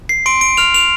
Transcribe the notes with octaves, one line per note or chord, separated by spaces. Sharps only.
C7
C6 D7
D7
F6 F7
F7